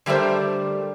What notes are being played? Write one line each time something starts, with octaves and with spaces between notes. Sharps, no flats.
D3 G3 A3 A#4 C5